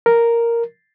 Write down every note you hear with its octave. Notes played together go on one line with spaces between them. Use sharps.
A#4